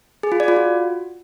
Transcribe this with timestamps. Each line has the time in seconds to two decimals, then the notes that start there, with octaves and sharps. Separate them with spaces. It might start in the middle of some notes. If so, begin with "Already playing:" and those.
0.23 G#4
0.32 F4
0.40 D5
0.48 F4
0.56 F#4